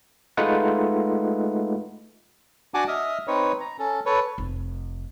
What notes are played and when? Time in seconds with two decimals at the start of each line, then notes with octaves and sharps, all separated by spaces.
0.37 G#3 A3 D#4 F4 B4 F#5
2.74 D4 F#4 F#5 G#5 A5 D6
2.88 D#5 E5 D#6 F6
3.27 C4 D#4 B4 C#5
3.60 A#5
3.79 C#4 A4
4.06 A4 B4 C#5
4.38 F1